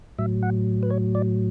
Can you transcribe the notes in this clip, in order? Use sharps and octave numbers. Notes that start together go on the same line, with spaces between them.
A2 F#3 E5
F#5
B4
C#5
D5